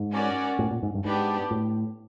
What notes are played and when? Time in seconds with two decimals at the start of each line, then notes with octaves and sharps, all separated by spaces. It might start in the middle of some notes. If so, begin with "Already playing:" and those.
Already playing: G#2
0.13 C#4 F#4 A#4 D5
0.59 A2
0.71 A#2
0.83 G#2
0.94 G2
1.05 G#2 B3 D4 G4
1.51 A2